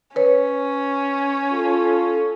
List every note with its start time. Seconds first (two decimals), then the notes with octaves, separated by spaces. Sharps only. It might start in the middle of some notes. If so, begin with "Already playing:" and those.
0.16 C#4 B4 C#5
1.52 F4 A4